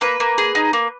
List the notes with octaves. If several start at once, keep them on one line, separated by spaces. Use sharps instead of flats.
A#3 B4
A#3
G#4
D#4
A#3